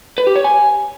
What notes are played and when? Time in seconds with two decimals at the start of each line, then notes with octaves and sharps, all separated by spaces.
0.18 B4
0.27 G4
0.36 C#5
0.44 G#5